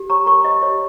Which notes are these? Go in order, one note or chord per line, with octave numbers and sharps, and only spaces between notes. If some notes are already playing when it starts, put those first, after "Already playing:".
Already playing: G4
C#5 A#5 C#6
A#4 A#5 C#6
C#5 D#5
G4 C#5